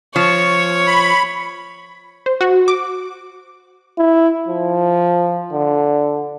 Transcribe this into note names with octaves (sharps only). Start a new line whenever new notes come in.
F3 C#5 C#6
B5
C5
F#4
D6
E4
F3
D3